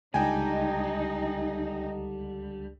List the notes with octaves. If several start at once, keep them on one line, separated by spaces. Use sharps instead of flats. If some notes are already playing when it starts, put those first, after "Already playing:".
C#2 D3 G3 D4 D#4 G5 G#5